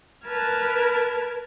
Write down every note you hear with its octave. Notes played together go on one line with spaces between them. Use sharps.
A#4 B4 A5 F6 G#6